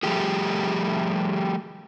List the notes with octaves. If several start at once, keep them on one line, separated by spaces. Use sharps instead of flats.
F3 G3 A3 G4 G#4